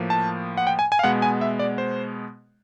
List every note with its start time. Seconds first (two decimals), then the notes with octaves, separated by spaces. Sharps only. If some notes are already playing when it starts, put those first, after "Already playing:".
Already playing: A2 F3 A#3
0.10 A5
0.57 F#5
0.67 G5
0.79 G#5
0.92 G#5
0.99 F5
1.04 B2 G#3 B3 F#5
1.22 G#5
1.41 E5
1.59 D5
1.78 C5